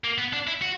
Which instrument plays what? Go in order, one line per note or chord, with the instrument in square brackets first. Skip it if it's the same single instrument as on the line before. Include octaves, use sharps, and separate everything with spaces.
[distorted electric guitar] A#3
B3
D4
E4
F#4